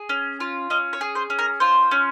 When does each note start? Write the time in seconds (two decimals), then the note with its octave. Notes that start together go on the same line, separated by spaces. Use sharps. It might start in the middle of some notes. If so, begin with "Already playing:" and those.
Already playing: G#4
0.09 C#4
0.40 F4
0.70 C#4 D#5
0.93 C#5
1.01 G#4
1.15 C5
1.30 C#4
1.39 A#4
1.60 F4 C5
1.91 C#4